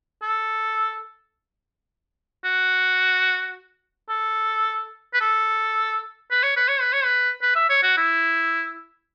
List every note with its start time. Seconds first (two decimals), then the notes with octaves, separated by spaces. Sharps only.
0.23 A4
2.44 F#4
4.10 A4
5.14 B4
5.21 A4
6.31 B4
6.43 C#5
6.56 B4
6.68 C#5
6.81 B4
6.93 C#5
7.05 B4
7.42 B4
7.56 E5
7.70 C#5
7.83 F#4
7.97 E4